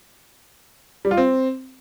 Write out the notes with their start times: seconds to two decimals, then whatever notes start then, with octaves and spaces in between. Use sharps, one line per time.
1.05 G3
1.11 F4
1.17 C4